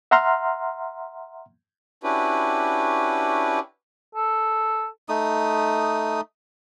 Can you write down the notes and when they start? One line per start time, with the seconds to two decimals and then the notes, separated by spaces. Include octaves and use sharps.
0.11 E5 F#5 A#5 C6 F6
2.04 C#4 D4 E4 F#4 G4 B4
4.15 A4
5.09 A3 D#4 D#6